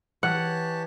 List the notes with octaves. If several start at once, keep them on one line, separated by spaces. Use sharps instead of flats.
E3 G4 C#5 F#5 A5